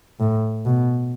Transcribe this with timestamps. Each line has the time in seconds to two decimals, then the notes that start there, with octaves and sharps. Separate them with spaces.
0.20 A2
0.66 B2